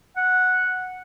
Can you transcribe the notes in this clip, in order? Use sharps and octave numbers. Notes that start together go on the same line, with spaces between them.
F#5